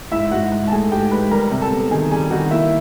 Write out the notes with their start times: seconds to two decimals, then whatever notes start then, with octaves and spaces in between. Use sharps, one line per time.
0.11 G#2 E4 E5
0.31 G#2 F#4 F#5
0.52 G#2
0.67 A5
0.72 A3 G#4 G#5
0.92 G#2 G4 G5
1.11 G#2 B4 B5
1.31 G3 A#4 A#5
1.51 C3
1.62 A4 A5
1.72 B3
1.91 D#3 G#4 G#5
2.11 G3 G#4 G#5
2.31 D#3 F#4 F#5
2.51 A#3 E4 E5